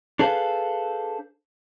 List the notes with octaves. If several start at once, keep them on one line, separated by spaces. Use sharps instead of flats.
D4 G#4 A4 B4 C5 F5